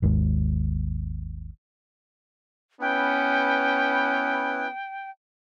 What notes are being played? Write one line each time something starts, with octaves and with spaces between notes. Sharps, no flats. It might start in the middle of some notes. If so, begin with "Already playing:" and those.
G#1 D#2 G#2
B3 C#4 E4 B4 G5